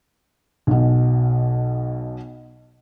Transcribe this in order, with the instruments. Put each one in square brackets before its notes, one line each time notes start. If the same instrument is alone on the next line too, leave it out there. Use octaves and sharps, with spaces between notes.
[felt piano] B1 B2